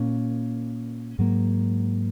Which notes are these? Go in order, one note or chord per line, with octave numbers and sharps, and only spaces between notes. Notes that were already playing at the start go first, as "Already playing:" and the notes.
Already playing: A#2 A#3 C#4
G#2 F#3 A#3